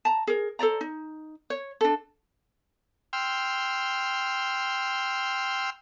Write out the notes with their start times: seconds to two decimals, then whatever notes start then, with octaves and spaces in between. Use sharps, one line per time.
0.05 A5 A#5
0.27 G#4 A#4
0.59 A4 C5 D5 A#5
0.81 D#4
1.50 C#5
1.81 D4 A4
3.13 G5 C6 E6 F6